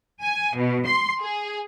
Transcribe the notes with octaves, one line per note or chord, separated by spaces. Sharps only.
G#5
B2
C6
G#4